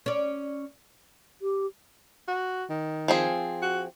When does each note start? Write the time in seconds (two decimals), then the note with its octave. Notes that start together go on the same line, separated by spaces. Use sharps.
0.06 C#4 D5
1.42 G4
2.28 F#4
2.70 D#3
3.08 F3 C4 G#4
3.62 F#4